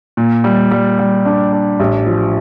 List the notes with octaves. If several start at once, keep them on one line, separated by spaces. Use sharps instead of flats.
A#2
G3
G3
G3
D4
D4
A1
F3